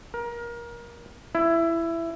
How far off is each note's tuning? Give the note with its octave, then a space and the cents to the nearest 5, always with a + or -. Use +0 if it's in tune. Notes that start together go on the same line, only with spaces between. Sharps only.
A#4 +25
E4 +15